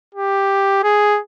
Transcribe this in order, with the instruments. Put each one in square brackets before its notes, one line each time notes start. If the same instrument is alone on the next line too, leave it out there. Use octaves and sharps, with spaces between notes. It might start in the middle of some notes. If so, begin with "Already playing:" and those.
[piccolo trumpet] G4
G#4